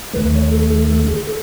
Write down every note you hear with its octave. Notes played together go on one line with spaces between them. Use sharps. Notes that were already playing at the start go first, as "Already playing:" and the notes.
D#2 D#3 A3 B4
C#5
A4
A4
A4
G#4
A4